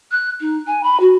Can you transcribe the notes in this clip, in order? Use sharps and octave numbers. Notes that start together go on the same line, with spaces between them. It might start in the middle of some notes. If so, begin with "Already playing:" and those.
F#6
D#4
G#5
B5
F#4